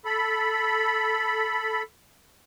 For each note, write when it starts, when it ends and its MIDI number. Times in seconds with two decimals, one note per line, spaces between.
0.05 1.83 69
0.05 1.83 83